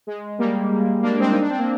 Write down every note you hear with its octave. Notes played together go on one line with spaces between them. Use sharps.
G#3
G3 A#3
A#3 D4
G#3 C4
D#4
D4
C4
A#3